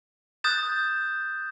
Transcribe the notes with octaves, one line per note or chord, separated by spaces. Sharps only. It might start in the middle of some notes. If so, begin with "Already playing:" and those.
D#6 F#6 G6 A6 E7